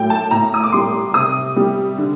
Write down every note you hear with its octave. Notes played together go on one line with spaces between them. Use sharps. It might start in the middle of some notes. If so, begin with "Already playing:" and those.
Already playing: A2 F#3 A3 G5
A5
A2 A#5
D#6
D6
G3 C6
C3 D#6
G3
D3